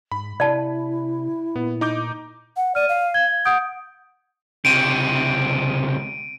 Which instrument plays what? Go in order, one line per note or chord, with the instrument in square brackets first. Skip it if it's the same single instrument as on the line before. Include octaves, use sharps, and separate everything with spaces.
[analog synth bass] G#2 [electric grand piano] B5
[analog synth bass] C3 [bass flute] E4 [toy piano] D5 A5
[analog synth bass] A#2 [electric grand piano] B3
[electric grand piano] D#4 D6 G6
[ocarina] F#5
[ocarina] D5 [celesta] F6 D#7
[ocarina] F5
[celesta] G#6 G7
[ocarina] F#5 [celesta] D#6 G6 D7
[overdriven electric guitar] C#2 C3 [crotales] D7 D#7